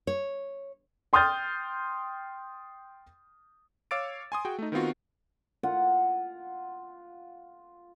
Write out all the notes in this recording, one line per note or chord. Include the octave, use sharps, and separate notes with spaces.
C#5
G5 C6 D#6 F6 G6 A6
C#5 F5 D6 E6 A6 D7
G#5 C6 D#6
F#4 G#4 G5
A3 D#4
D#3 B3 C4 F4 F#4
F4 F#5